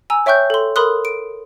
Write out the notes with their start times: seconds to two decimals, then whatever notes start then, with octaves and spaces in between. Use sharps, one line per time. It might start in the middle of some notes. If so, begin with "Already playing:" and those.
0.10 G#5 A#5 E6
0.26 C#5 E5 G5 C#6 F#6 G6
0.50 A4 C6
0.76 A4 A#4 B5 C6 D#6 F#6
1.05 D7